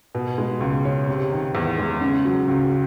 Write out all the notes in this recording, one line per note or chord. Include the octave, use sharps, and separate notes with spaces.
B2
G#3
C#2
C#4
C3
D#3
E2
G#3
C#3
F#3
C#2